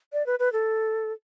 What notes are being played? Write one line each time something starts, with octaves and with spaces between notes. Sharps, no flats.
D5
B4
B4
A4